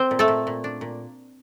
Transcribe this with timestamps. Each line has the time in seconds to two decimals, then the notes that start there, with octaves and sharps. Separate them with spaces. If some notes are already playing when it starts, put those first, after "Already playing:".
Already playing: C4 C5
0.11 A#2
0.19 A3 A4
0.28 A#2
0.47 A#2
0.64 D4
0.81 A#2